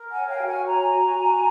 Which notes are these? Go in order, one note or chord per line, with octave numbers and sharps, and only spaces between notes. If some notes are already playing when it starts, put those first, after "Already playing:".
Already playing: A#4
F#5 G#5
C#5
F5 G5
F#4
F#5 G#5
C#5 G#5 A#5
F#4
F#4